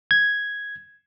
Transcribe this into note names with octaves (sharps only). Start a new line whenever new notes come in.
G#6